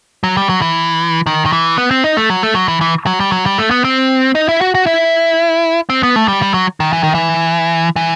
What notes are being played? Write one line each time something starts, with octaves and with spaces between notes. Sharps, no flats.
F#3
G3
F#3
E3
D#3
D#3
E3
B3
C4
D#4
A3
F#3
A3
F#3
E3
E3
F#3
G3
F#3
G3
A3
B3
C4
D#4
E4
F#4
F#4
E4
C4
B3
A3
G3
G3
F#3
D#3
E3
D#3
E3
E3